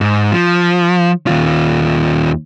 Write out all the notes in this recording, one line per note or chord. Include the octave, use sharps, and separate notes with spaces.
G#2
F3
D#2 F4